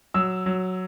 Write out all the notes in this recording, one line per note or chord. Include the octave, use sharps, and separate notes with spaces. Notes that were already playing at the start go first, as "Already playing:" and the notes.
F#3 E6
F#3